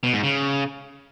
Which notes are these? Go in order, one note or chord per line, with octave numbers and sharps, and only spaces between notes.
B2
G#2
C#3